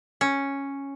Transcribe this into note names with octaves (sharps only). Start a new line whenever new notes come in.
C#4